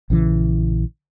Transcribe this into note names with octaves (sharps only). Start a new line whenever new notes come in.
A#1 C#3 E3